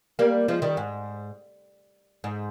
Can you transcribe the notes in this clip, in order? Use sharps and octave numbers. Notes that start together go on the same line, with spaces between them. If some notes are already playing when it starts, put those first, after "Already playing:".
G3 A#3
F3 G#3
D#3 G3
G#2
G#2